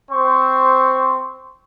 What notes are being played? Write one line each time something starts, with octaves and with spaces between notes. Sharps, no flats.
C4 C5 C#6